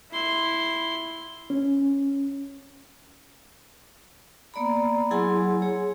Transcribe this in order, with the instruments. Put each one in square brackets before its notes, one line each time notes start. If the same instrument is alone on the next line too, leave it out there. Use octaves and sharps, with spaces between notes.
[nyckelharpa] E4 C6
[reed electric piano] C#4
[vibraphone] A#3 B3 D5 A#5 B5
F#3 E4 G#4 F#5 G#5 C6
G#4 C#5